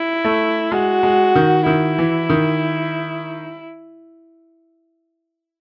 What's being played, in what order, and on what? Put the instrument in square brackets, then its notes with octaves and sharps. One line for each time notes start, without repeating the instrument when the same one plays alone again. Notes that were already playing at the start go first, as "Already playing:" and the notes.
Already playing: [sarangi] E4
[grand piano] A3
[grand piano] G#3 [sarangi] F#4
[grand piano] G#3
D#3
[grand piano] D#3 [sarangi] E4
[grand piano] E3
D#3